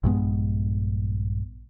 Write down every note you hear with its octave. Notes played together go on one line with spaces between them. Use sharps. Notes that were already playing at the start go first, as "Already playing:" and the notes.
A#1 G2 G#3 B3